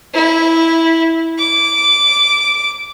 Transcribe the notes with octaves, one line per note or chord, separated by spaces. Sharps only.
E4
D6